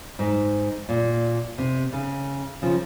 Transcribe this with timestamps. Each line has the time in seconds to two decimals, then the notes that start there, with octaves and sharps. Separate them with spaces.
0.19 G#2
0.89 A#2
1.58 C3
1.93 C#3
2.62 C#3 F3